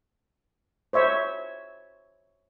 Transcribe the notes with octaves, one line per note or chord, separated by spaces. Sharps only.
C5 C#5 E5